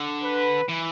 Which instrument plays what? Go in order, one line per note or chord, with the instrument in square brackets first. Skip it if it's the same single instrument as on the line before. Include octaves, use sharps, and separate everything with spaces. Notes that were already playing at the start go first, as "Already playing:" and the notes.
Already playing: [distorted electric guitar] D3
[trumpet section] B4
[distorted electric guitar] E3